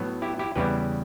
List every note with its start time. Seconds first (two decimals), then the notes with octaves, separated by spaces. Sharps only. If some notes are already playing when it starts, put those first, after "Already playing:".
Already playing: A2 F#3 B3
0.22 E4 G4
0.39 E4 G4
0.56 E2 C#3 G3 B3 E4 G4 B4